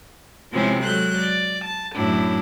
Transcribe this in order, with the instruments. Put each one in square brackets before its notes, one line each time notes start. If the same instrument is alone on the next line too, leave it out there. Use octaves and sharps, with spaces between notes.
[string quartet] C3 F3 G#3 C4 C#4 E4
F#3 G#3 A4 F#6 G6
D5
A5
F#2 A2 D4 E4